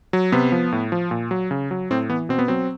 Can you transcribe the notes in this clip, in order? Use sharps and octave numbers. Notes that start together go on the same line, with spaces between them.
F#3
C3 B3
F3
A2
F3
A#2
F#3
C#3
F#3
A2 C4
E3 B3
B2 C4
B3
F#3 C4